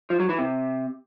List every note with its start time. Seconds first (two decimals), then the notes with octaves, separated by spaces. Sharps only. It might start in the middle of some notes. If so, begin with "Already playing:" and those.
0.10 F3
0.20 F#3
0.29 E3
0.39 C3